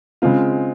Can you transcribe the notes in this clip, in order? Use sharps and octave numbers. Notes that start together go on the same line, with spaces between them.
C#3 G#3 C4 F4